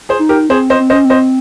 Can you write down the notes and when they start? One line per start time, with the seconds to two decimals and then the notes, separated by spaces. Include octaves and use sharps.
0.09 G#4 C5
0.19 D#4
0.29 G4 A#4
0.49 C4 G#4 C5
0.70 C5 D#5
0.80 C4
0.90 C#4 C5 D#5
1.05 C4
1.10 C5 D#5